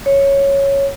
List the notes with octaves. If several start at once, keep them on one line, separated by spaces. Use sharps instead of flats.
C#5